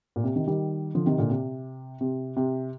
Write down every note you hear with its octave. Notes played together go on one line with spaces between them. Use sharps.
A#2
C3
C3 D#3
D#3 G3
D3 F3
C3 D#3
A#2 D3
C3
C3
C3